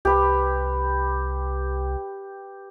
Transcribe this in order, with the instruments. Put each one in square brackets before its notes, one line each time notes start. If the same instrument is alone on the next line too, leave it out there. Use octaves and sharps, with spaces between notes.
[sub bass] C2 [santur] G4 B4